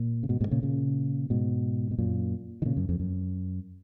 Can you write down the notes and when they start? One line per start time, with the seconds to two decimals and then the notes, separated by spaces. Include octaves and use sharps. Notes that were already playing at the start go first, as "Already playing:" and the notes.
Already playing: A#2
0.23 C#3
0.29 G#2 B2
0.41 G#2 B2
0.48 D#3
0.51 A#2 C#3
0.63 A#2 C#3
1.30 G#2 B2
1.91 B2
1.98 F#2 A#2
2.62 D#3
2.65 A#2 C#3
2.77 F#2
2.89 F2
3.00 F#2